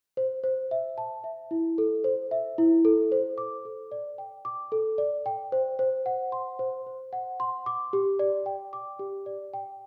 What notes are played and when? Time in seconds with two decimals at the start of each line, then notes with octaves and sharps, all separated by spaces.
0.17 C5
0.44 C5
0.71 E5
0.98 A5
1.24 E5
1.51 E4
1.78 A4
2.04 C5
2.31 E5
2.58 E4
2.85 A4
3.12 C5
3.38 D6
3.65 A4
3.92 D5
4.18 G5
4.45 D6
4.72 A4
4.98 D5
5.26 G5
5.52 C5
5.79 C5
6.06 F#5
6.32 C6
6.59 C5
6.87 C5
7.13 F#5
7.40 C6
7.66 D6
7.93 G4
8.19 D5
8.46 G5
8.73 D6
8.99 G4
9.26 D5
9.54 G5